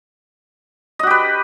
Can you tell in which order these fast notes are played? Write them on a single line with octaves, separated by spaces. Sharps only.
D#5 F#4 G4 B4